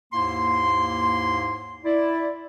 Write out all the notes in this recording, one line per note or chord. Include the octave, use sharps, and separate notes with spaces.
D#2 G#2 A#3 E4 C6
E4 D5